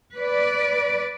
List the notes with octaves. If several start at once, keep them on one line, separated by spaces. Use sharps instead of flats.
B4 D5